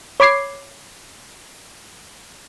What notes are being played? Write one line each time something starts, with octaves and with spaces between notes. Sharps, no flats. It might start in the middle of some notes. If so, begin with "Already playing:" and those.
C#5 B5 D6 G#6 C7